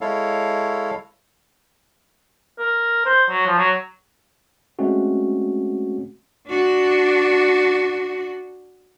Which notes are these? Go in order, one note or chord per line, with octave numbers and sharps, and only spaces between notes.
G#3 E4 A4 C#5 F5
A#4
C5
F#3
F3
F#3
G#3 A3 C4 C#4 F#4
D4 F#4